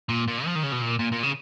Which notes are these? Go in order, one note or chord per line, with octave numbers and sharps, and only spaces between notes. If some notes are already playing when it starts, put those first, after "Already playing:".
A#2
A#2
F3
D#3
C#3
B2
A#2
A#2
A#2
C#3